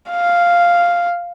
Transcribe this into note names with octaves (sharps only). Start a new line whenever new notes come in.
F5